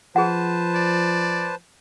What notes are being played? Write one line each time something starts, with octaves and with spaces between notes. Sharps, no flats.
F3 G#4 B4 C5 F#5 A5
D5